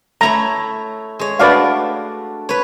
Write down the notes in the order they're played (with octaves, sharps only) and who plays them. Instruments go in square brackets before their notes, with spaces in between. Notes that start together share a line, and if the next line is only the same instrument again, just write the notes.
[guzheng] A3 E4 C#5 [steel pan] A#5
[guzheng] G#3 C#5
[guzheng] A3 D4 F#4 [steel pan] B4 D5 F5
[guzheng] B4 C#5